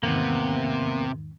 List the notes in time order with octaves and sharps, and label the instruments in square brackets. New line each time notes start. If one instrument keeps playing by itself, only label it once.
[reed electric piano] E2 G#2 D#3 [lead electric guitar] C3 [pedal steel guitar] A#3 B3